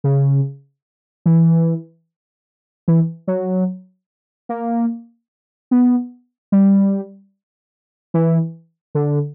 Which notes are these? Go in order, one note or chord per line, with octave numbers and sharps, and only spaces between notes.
C#3
E3
E3
F#3
A#3
B3
G3
E3
D3